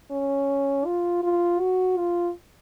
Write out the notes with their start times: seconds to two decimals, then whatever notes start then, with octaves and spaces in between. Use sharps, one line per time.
0.11 C#4
0.86 F4
1.23 F4
1.60 F#4
1.98 F4